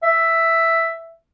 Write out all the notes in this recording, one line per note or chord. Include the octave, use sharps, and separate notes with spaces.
E5